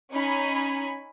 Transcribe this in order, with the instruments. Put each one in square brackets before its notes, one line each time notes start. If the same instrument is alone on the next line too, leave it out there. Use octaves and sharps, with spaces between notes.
[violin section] C#4 D#4 G#5 B5